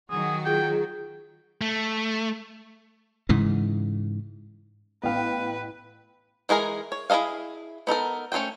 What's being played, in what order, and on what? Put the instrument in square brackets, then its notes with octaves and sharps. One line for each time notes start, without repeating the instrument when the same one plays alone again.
[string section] D#3 F#3 F#4 [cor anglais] G#4
[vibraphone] F4 G#4 [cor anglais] G5
[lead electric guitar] A3
[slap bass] G#2 C#3 E3
[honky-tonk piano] A1 G5 [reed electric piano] B3 F5 [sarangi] B4
[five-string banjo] E3 G#3 G#4 A#4 G#5
C#5
E4 G#4 A4 D#5 F5
B3 D#4 A4 A#4
A3 C#4 G#4 C5 G5